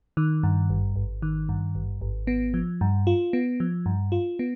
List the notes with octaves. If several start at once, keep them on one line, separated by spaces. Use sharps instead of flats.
D#3
G2
G#1
G#1
D#3
G2
G#1
G#1
B3
F3
G2
F4
B3
F3
G2
F4
B3